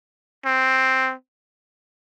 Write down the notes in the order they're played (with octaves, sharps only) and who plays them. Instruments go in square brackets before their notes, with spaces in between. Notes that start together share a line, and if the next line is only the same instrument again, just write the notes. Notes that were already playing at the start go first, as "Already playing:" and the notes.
[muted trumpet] C4